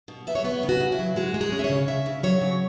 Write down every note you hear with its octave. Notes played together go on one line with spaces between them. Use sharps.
B2
B3 E5
C#5
B3 B4
C#3
F#4
C#3
E4
F#3
G#3 F#4
G#3
G#4
C#4
E5
C#5
C#3
C#3 E5
C#3
F#3 C#5
C#3